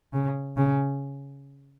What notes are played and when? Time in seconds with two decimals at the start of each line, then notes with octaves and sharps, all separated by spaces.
0.13 C#3
0.57 C#3